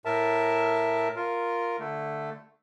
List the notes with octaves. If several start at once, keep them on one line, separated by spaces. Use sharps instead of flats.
A2 A#4 E5 A5
F4 A#4
D3 A3